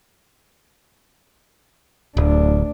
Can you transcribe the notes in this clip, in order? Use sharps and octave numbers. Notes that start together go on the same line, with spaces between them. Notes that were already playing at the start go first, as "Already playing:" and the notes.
D1 D2 D4